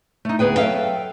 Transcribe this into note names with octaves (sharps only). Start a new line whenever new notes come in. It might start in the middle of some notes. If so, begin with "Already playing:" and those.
A3 D#4
D2 B3 G#4 B4 G5
F#3 A4 E5 F5 G5